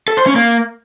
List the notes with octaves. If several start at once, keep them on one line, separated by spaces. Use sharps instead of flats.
A4
C5
C#4
A#3